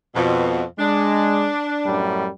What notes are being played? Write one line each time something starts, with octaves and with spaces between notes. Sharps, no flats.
F2 B2
G#3 D4
F#2 A2 G3